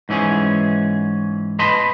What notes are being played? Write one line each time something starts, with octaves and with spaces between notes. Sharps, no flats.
G#2 E3 C#4 G#4
B4 D#5 A5 B5 C6